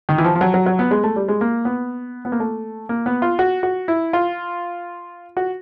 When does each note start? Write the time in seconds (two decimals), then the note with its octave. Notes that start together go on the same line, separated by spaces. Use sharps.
0.09 D#3
0.18 E3
0.24 F3
0.35 F3
0.41 F#3
0.54 F#3
0.66 F#3
0.79 B3
0.91 G#3
1.04 A3
1.16 G3
1.28 G#3
1.41 A#3
1.65 B3
2.25 B3
2.32 A#3
2.40 A3
2.89 A#3
3.06 B3
3.22 F4
3.39 F#4
3.63 F#4
3.88 E4
4.13 F4
5.37 F#4